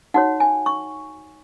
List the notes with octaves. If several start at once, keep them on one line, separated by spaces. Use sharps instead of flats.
D#4 F#4 C#5 F#5
G#5
C#6